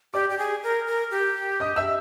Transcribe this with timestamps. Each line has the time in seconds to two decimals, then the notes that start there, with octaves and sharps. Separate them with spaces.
0.14 G4 D5 D6
0.30 G4
0.38 G#4
0.63 A#4
0.87 A#4
1.11 G4
1.60 D#5 D#6
1.76 E5 E6